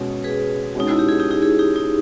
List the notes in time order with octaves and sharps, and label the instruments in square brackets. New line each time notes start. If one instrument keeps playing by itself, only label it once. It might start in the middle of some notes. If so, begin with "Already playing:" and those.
Already playing: [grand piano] B2 G#3 C#4
[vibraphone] G#4 B4
[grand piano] B2 G#3 C#4 [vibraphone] D#4
[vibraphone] E4
G4
E4 G#4
D#4 G4
D#4 G4
E4 G#4
D#4 G4
D#4